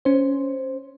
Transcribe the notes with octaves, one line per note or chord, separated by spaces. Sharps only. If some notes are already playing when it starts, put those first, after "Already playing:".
C#4 C5